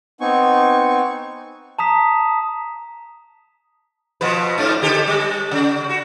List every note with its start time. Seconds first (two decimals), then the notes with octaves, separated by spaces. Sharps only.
0.21 B3 C4 D#4 G#5 C#6
1.79 A5 A#5 D#6 B6
4.21 B2 F3 B4
4.58 G#2 D4
4.82 D3 G4 A4
5.07 G3
5.51 C#3
5.89 F#4